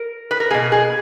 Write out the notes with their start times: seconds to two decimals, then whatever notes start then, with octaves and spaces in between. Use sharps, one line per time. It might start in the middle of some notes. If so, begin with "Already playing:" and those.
Already playing: A#4
0.31 B4
0.40 A#4
0.50 B2 A#3 G#4
0.72 G#4